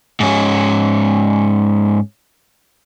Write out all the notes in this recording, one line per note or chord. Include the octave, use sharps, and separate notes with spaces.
G#2 C#4